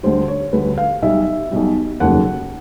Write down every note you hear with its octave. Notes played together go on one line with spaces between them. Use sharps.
D2 D3 G3 C5
C#5
D2 D3 G3 B4
F5
B1 B2 G3 E5
B1 B2 G3
F1 D#2 C#3 F#3 F#5